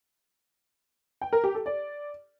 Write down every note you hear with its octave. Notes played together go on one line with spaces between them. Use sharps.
G5
A#4
G4
A4
D5